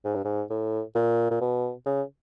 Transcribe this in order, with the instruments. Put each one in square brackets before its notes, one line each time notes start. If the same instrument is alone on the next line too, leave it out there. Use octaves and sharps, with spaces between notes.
[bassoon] G#2
G2
G#2
A2
A#2
A#2
B2
C#3